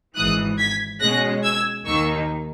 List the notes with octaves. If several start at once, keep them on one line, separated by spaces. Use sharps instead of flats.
G#1 G#2 E3 D#6 F#6
G#6 B6
B2 G#3 C#4 F#6 A#6
E6 G#6
D#2 D#3 A#3 D#4 C#6 E6